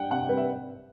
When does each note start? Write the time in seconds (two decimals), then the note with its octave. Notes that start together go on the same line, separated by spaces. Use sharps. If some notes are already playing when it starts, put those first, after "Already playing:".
Already playing: G3 D4 F#5 G5
0.10 C3 F#5
0.28 G3 B4
0.37 E5